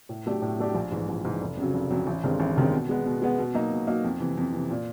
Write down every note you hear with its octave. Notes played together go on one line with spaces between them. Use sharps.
A2
F#3 A3 D4 G4
A2
F#3 A3 D4 G4
A#1
G#2 E3
A#1
G#2 E3
F1
F2 C#3 F#3
F1
F2 C#3 F#3
A1
G2 D#3 G#3 C4
A1
G2 D#3 G#3 C4
B2
G#3 B3
B2
G#3 B3
B2
F#3 A#3 D#4
B2
F#3 A#3 D#4
F2
C3 E3
F2
C3 E3
A#2